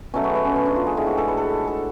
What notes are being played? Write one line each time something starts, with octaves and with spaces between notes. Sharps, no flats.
B2 F#3 A3 C#4
B3
B3
C#4
C#4
D4
F4
G#4
A2 G#3
F#4
A4
B4
A4
A4